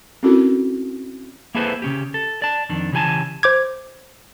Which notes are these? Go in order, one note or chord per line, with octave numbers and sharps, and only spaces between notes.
C4 C#4 E4 F#4 A4 A#4
A#3 E4 G#4 A4 B4 C5
C#3 C#4 G4
A4
D5 A5
F2 D#3 D4
C#3 E3 G4 B4 G#5 A5
C5 D6 G#6